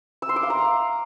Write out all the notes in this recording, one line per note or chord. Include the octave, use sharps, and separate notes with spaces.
E6
C6
D6
F5
A#5